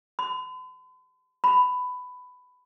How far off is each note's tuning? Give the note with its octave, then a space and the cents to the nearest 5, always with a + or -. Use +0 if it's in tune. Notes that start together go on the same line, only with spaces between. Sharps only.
B5 +45
B5 +15